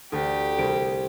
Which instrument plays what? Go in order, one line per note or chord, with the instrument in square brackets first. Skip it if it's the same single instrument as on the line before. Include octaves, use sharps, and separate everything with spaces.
[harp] D2 [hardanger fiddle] G4
[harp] C2 D7